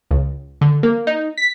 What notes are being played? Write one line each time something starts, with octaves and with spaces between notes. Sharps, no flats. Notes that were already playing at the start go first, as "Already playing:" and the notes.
C#2
D3
A#3
D#4
B6